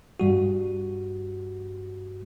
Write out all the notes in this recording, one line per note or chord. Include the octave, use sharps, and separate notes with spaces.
G2 G3 F#4